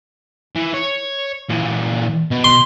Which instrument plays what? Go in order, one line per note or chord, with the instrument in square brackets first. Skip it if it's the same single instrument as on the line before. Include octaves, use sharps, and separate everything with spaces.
[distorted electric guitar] E3
C#5
A#2 E3
B2
[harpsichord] C6